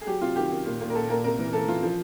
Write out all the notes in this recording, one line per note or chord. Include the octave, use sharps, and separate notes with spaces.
G#4
F#3 G4
C3 F4
D#3 G4
D#3
A#2
A#2
A#4
A#2 A4
A#2 A#4
C3 A#4
E3
E3 A4
E3 F4
F3